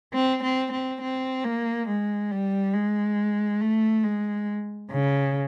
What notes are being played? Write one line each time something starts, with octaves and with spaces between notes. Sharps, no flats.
C4
C4
C4
C4
A#3
G#3
G3
G#3
A3
G#3
C#3